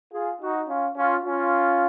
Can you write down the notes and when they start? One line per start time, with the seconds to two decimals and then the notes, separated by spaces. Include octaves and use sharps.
0.13 F4 G#4
0.41 D#4 F#4
0.69 C#4 F4
0.97 C#4 F4
1.25 C#4 F4